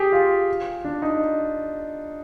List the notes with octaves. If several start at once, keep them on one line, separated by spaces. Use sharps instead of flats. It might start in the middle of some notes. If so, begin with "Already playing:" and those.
Already playing: G4 G#4
F4
D4
D#4